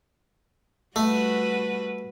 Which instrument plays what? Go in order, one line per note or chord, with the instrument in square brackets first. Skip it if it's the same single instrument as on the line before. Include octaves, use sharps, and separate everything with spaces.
[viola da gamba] G3 F#4 B4 [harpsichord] A3